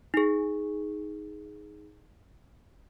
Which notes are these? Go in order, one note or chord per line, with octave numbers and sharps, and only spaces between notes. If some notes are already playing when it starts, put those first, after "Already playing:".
D#4 G#4